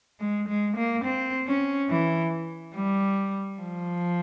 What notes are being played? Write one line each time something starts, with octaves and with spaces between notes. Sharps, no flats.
G#3
G#3
A#3
C4
C#4
E3
G3
F3